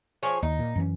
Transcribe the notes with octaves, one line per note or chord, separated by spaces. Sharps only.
F3 G#4 C#5
D#2 D#4
A#2
F#2 E3 C#4